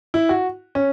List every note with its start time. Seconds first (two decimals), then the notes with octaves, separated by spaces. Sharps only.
0.14 E4
0.29 F#4
0.75 C#4